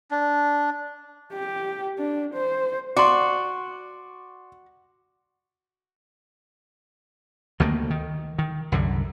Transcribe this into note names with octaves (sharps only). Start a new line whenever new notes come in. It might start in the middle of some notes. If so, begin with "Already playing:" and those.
D4
G4
D4
C5
F#4 D5 C6
D2 D#3 A3 A#3
D#3
D#3
C2 F#2 D3